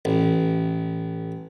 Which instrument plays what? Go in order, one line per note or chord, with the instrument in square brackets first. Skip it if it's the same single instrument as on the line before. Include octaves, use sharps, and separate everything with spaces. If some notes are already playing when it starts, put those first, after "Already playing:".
[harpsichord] A1